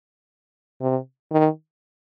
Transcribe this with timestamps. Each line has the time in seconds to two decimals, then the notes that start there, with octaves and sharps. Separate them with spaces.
0.81 C3
1.32 D#3